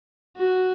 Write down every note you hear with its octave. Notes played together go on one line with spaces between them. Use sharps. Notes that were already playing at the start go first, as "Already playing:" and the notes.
F#4